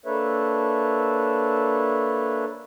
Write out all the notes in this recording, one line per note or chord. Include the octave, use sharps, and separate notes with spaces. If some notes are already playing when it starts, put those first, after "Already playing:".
A#3 D4 A4 B4 C#5 E5